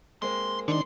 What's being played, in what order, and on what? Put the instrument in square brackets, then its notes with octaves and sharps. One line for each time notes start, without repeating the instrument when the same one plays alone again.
[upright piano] G#3 A#3 C4 [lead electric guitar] C6
[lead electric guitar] D3 C6 [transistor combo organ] D#3 D4